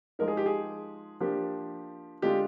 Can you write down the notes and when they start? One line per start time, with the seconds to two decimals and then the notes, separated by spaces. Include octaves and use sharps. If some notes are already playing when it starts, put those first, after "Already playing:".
0.19 F3 G#3 D#4 A#4
0.28 G#4
0.37 G4
0.46 G#4
1.20 F3 A#3 D4 G4
2.22 D3 G#3 D4 F4 G4